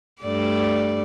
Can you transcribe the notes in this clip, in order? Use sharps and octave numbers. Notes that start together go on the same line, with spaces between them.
G2 A3 D5